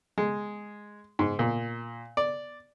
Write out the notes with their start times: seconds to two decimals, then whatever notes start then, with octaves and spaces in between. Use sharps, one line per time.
0.18 G#3
1.19 G#2
1.39 A#2
2.17 D5